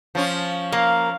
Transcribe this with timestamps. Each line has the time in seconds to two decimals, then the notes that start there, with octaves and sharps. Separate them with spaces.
0.15 F3 C#4
0.72 A#3 F5